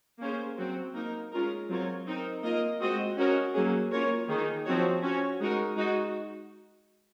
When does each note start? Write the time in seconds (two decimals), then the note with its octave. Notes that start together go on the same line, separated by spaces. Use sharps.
0.21 A#3 C#4 G#4 C5
0.58 F#3 C4 F#4
0.94 A#3 D#4 A#4
1.32 G#3 C#4 F4 A#4
1.68 F#3 C4 F4 A#4 C#5
2.06 C4 D#4 A#4
2.43 A#3 F4 A#4 D#5
2.80 G#3 C4 F#4 C5 D#5
3.17 C#4 F#4 A#4 D#5
3.54 F#3 A#3 C#4 G#4
3.91 A#3 C#4 F4 A#4 C#5
4.28 D#3 A#3 D#4 G#4
4.65 F3 C4 F#4 C#5
5.02 C#4 F#4 C#5
5.39 G#3 D#4 F#4 A#4
5.76 G#3 D#4 F#4